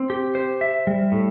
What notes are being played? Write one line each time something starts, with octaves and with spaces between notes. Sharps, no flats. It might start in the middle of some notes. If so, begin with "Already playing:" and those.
Already playing: C4
G4
C5
E5
G3
A2